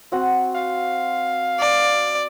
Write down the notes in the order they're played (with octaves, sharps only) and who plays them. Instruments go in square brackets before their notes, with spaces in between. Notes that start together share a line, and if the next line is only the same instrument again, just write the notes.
[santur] C4 F#4 F#5
[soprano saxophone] F5
[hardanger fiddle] D5